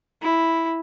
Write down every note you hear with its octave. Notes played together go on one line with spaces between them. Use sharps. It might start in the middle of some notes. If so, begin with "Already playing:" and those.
E4